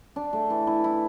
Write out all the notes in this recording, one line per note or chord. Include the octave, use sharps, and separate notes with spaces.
D4
A3
E3
E4
E4